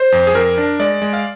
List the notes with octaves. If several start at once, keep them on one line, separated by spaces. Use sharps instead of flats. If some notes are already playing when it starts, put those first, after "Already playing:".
Already playing: C5
F2
G#4
F2 A#4
D4
G#3 D5
G#3
F5